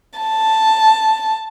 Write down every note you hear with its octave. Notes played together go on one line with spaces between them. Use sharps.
A5